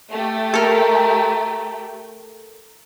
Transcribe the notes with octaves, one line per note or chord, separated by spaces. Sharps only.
A3 G4
A4 A#4